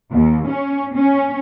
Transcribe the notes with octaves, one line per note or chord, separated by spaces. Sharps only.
D#2
C#4
C#4